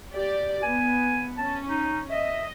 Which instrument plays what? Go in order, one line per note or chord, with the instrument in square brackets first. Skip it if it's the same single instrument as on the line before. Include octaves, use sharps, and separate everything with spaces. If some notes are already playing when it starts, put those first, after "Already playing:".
[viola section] G4 D5
[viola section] B3 [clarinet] G#5
[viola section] C#4 [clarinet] A5
[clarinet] D#4
[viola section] D#5 [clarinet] E5